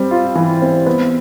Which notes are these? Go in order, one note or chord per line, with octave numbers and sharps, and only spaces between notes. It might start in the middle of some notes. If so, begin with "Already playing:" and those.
Already playing: G3 C4
F4
E3
C4
B3